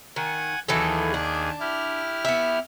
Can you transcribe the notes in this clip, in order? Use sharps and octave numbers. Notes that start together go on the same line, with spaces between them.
D#3 F#5 G#5
D#2 E3 F#3 G#4 A4
D4
E4 G4 F6
B3 E5